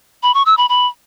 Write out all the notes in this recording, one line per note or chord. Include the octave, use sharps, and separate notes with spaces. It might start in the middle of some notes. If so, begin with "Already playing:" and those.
B5
C#6
E6
B5
B5